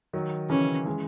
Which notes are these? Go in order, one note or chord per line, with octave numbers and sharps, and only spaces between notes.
D#3 F#3
C#3 E3 C#4
E3 G#3